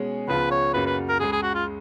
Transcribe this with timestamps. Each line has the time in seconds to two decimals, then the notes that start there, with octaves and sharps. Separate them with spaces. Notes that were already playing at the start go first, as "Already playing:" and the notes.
Already playing: B2 G#3 C#4 G#4
0.28 C#2 C#3 F3 B3 F4 B4
0.51 C#5
0.73 F#2 C#3 F#3 A#3 B4
0.86 B4
1.09 A#4
1.20 C#2 C#3 G#3 G#4
1.32 G#4
1.43 F#4
1.54 F4